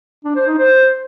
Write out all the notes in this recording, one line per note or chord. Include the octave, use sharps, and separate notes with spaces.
D4
C5
D#4
C5